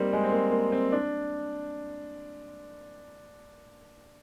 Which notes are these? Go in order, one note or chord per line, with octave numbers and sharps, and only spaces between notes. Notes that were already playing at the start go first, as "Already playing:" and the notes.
Already playing: G3 A#3 C4 D#4
G#3
C4
A#3
A#3
C4
D4